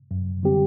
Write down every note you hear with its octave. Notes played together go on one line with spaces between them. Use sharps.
F#2
D3 G3 C4 G4